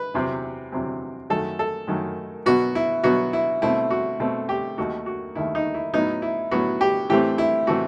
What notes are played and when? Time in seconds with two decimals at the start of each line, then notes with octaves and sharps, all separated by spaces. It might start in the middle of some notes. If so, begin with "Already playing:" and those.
Already playing: B4
0.14 E2 C3 F#3 C4
0.72 E2 C3 F#3 C4
1.30 F#2 D#3 F#3 A3 A4
1.59 A4
1.87 F#2 D#3 F#3 A3
2.46 B2 F#3 B3 F#4
2.75 E4
3.04 B2 F#3 B3 F#4
3.33 E4
3.62 B2 A3 C4 E4
3.90 F#4
4.20 B2 A3 C4
4.49 G4
4.77 D#2 D#3 A3 F#4
5.06 F#4
5.35 D#2 D#3 A3 E4
5.55 D#4
5.74 E4
5.93 A2 F#3 B3 D#4
6.22 E4
6.51 A2 F#3 B3 F#4
6.81 G4
7.09 A2 E3 A3 C4 G4
7.38 E4
7.67 A2 E3 A3 C4 F#4